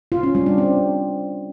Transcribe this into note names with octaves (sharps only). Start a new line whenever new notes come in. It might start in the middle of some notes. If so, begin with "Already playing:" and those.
F4
C#4
G3
D4
C4